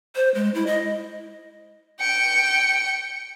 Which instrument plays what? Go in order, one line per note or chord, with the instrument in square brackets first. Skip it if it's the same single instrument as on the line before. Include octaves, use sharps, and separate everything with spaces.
[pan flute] C5
G#3
E4
D#5
[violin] G5 C#7